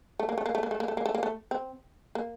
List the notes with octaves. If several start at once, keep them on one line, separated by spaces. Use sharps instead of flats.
A3
A#3
A3
A#3
A3
A#3
A3
A#3
A3
A#3
A3
A#3
A3
C4
A#3